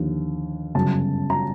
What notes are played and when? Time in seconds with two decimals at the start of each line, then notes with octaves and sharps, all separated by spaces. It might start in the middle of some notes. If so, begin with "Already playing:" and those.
Already playing: D#2 D3 F3
0.75 G1 F#2 C#3 A5
1.30 A#5